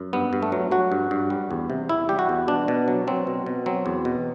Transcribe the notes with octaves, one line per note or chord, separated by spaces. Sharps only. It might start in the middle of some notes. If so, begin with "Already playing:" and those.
Already playing: F#2
G2 B3
G2
A3
F#3
F#3 F#4
G2
G2
G3
E2
C3
E2 E4
G3 G4
F#4
E2
B2 D4
B2
F#3
F#3 C4
B2
B2
F#3 C4
E2
B2